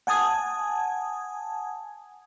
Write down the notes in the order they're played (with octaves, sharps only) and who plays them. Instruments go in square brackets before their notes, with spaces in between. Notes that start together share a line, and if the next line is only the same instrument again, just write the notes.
[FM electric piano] F#5 G#5 A5 D#6 G#6